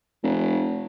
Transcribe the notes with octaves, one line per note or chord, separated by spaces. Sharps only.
F1